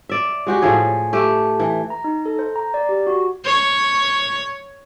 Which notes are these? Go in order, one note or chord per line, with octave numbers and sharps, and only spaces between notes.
D5 E5
G#3 F#4 G4
A2 F3 G#4 C#5
A3 G4
E3
A#5
D#4
A4
C5
A#5
D5
G4
F#4
C#5